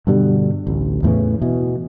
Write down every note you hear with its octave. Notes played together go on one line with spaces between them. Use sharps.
G2 B2 D3 G3
A1 D2
E2 A2 C#3 E3
B2 E3